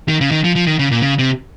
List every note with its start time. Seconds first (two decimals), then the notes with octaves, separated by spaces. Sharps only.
0.08 D#3
0.21 C#3
0.31 D#3
0.44 F3
0.55 F3
0.67 D#3
0.79 C#3
0.91 A#2
1.02 C#3
1.19 C3